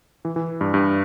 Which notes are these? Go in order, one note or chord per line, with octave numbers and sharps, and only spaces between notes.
E3
E3
G2
G2